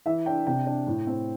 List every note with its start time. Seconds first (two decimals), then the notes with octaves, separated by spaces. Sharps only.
0.06 E3 E5
0.26 D4 G5
0.47 C3 G5
0.66 D4
0.87 A2
1.07 C4